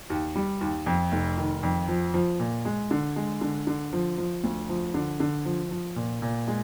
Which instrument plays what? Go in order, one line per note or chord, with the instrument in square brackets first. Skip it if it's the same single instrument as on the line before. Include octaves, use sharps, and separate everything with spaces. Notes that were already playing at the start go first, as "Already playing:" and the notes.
[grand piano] D#2
G3
D#2
F2
F1
D#3
F2
F3
F3
A#2
G#3
D3
G#3
D3
D3
F3
F3
D2
F3
D3
D3
F3
F3
A#2
A#2
G#3